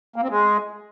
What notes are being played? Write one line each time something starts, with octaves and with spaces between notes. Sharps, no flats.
A#3
C4
G#3